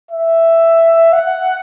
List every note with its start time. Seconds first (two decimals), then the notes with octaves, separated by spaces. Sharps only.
0.11 E5
1.13 F#5